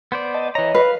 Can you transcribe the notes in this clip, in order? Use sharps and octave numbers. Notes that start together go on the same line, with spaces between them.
B3 C5 D5
D#5 A5
E3 C#5 D#5 A#5
B4 F5